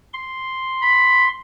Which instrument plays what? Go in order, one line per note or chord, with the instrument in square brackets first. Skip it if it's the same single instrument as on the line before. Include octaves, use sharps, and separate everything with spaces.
[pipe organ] C6
[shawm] B5